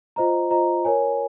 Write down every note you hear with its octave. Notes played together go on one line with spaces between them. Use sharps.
F4 C5 D#5 A#5
F4 C5 D#5 A#5
A#4 C#5 G#5